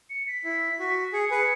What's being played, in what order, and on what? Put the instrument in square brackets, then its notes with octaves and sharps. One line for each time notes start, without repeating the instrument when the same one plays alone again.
[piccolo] C#7
B6
[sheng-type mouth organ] E4
F#4
[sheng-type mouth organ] G#4 [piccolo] C#7
[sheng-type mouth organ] G#4 B4